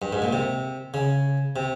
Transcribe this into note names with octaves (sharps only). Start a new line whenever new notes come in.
G2
G#2
A#2
C3
C#3
C3